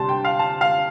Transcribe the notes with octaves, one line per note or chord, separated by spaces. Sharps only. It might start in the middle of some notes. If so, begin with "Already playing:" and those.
Already playing: D2 C3 G3 A5 C6
G5
F5
A5
F5